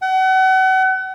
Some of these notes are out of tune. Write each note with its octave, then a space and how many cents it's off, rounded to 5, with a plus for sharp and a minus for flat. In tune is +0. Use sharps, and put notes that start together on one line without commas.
F#5 +35